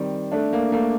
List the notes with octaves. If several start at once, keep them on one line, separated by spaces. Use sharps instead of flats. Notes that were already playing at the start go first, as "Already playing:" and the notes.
Already playing: D#3 G3 C4
A3 D4
A#3
A3 A#3